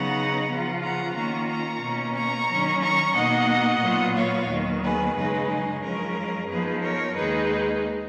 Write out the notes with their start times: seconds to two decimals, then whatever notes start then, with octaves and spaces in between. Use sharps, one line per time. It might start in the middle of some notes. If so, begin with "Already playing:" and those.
Already playing: C#3 F#3 B3 D#4 F#5 A#5
0.49 C#3 F3 B3 F4
0.83 F#5 A#5
1.15 D#3 A#3 C#4 F4 A#5 C#6
1.49 A#5 C#6
1.82 B2 A#3 C#4
2.15 A#5 C#6
2.49 D#3 F#3 C#4
2.82 A#5 C#6
3.15 B2 A#3 D#4 D#5 F#5
3.82 A#2 F#3 B3 F4
4.16 C#5 F5
4.49 D#2 D#3 F#3 B3
4.83 G#4 B4
5.16 F#2 C#3 G#3 D#4 G#4 B4
5.49 G#4
5.83 F#2 F3 G#3 C#4 A#4
6.49 F#2 F3 B3 D#4 G#4 B4
6.82 A#4 C#5
7.16 D#2 D#3 G#3 D#4 G#4 B4